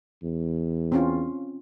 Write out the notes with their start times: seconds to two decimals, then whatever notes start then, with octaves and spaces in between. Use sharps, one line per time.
0.23 E2
0.92 C4 C#4 F4